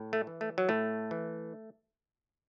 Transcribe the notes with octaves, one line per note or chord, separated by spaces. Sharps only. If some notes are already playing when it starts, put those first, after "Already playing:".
Already playing: A2
A3
E3
A3
F#3
A2 A3
E3